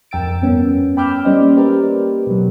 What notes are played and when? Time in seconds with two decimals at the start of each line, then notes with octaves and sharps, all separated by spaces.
0.11 F2 A#4 G5 E6 A6 D7
0.42 G2 B3 C#4
0.97 G5 B5 D6 E6 F6 G6
1.25 G3 A#3 C#4 C5 D5 D#5
1.57 G4 A#4 B4 D5
2.27 B2 F#3